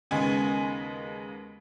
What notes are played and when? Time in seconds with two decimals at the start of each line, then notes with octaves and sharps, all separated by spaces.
0.11 D#2 C#3 G#3 B3 G#5